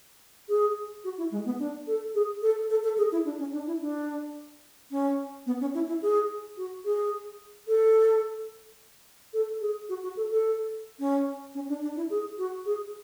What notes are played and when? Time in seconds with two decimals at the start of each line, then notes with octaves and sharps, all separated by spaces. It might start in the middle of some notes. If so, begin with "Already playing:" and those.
0.49 G#4
1.04 F#4
1.18 E4
1.31 G#3
1.45 B3
1.59 D4
1.87 A4
2.15 G#4
2.42 A4
2.70 A4
2.83 A4
2.97 G#4
3.12 E4
3.25 D4
3.39 C#4
3.53 D4
3.67 E4
3.81 D4
4.91 C#4
5.46 B3
5.61 C#4
5.74 E4
5.88 E4
6.02 G#4
6.57 F#4
6.85 G#4
7.68 A4
9.33 A4
9.61 G#4
9.89 F#4
10.03 F#4
10.17 A4
10.30 A4
10.99 C#4
11.55 C#4
11.69 D4
11.82 D4
11.96 E4
12.10 G#4
12.38 F#4
12.65 G#4